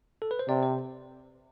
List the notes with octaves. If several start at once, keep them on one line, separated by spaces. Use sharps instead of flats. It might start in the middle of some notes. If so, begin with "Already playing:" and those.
A4
B4
C5
C3 D5
C5